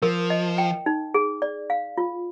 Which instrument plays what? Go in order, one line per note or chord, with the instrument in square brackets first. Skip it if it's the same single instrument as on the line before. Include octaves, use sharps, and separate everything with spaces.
[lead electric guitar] F3 [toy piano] A#4
[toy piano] D#5
G5
D#4
G#4
D5
F5
F4